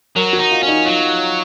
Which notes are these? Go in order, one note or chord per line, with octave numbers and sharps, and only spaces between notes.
F#3 A#4
F#4
D#4
F4
C#4
D#4
F#3 F4